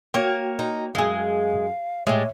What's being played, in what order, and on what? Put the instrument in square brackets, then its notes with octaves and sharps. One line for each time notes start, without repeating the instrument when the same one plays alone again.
[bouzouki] A#3 C#5 [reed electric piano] F#4 G5
[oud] D#4
[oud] F#2 G#4 [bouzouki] G#3 [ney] F5
[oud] A2 G4 [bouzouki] G#3 [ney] C#5 [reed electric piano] E5